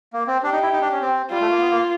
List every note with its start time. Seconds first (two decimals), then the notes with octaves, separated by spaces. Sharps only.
0.13 A#3
0.27 C4
0.43 D4 G4
0.52 D#4
0.62 E4
0.72 D#4
0.82 D4
0.92 C#4
1.02 C4
1.31 G3 F4
1.41 A3
1.51 A#3
1.61 B3
1.71 A#3